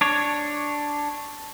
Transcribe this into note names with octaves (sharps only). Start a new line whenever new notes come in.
D4 C#5